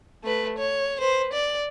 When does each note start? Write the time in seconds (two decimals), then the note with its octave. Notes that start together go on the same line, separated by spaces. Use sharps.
0.23 A3 B4
0.59 C#5
1.01 B4 C5
1.33 D5